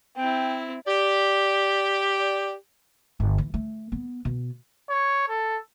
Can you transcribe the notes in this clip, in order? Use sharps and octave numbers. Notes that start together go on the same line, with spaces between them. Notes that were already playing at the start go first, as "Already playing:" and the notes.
C4 E4 G5
G4 D5
G1
E3
A3
B3
B2
C#5
A4